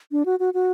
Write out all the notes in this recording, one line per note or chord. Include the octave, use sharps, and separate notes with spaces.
D4
F#4
F#4
F#4